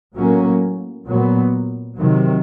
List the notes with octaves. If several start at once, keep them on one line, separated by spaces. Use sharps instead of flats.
A2 F#3 A#3 C#4
A#2 F#3 B3
C3 D#3 F#3